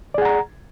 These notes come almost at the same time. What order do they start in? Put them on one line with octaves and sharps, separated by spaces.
D5 G#4 F#5 A#5